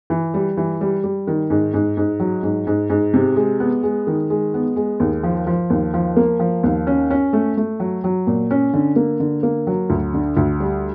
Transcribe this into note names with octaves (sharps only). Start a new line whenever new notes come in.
E3
G3
E3
G3
G3
D#3
G#2
G#2
G#2
F#3
G#2
G#2
G#2
C3
G#3
B3
G#3
D#3
G#3
B3
G#3
D#2
F3
F3
D#2
F3
A#3
F3
D#2
C#4
C#4
A3
A3
F#3
F#3
A#2
C#4
D3
A#3
D3
A#3
F#3
D2
D3
D2
G3